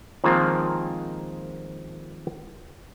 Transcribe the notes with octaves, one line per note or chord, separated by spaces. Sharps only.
D#3 F3 G#3 A#3 C4 F4